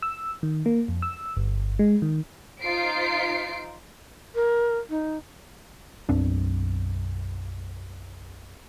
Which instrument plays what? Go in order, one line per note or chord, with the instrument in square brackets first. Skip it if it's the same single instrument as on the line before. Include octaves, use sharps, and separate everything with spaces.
[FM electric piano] E6
D#3
A#3
F2
E6
G1
G#3
D#3
[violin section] D#4 F4 C5 C7 D7
[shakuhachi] A#4
D#4
[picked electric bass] B1 F#2 C4 D4